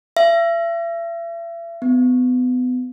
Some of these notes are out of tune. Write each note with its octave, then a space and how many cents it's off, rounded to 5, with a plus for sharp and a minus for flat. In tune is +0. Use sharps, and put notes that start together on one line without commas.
E5 +40
B3 +30